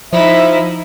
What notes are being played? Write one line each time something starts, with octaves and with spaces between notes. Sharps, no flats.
F3 D#4 E4 E5